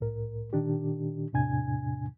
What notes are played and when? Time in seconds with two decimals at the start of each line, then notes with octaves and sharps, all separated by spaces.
0.01 C2 A2 A#4
0.53 A#2 D#3 D4 G4
1.33 E2 A2 C3 D4 G#5 G#6